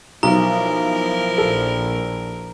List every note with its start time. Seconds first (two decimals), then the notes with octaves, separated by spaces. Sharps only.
0.23 B1 F3 E4 A#4 A#5
1.38 A#1 A4